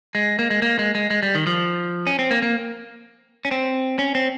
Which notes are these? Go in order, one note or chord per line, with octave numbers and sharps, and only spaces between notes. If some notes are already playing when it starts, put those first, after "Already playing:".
G#3
A#3
G#3
A#3
G#3
G#3
G#3
G3
D#3
F3
C#4
C4
A#3
A#3
C#4
C4
C#4
C4